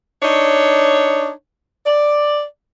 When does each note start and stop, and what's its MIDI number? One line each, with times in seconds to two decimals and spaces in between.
0.22 1.30 62
0.22 1.30 63
0.22 1.30 73
1.85 2.42 74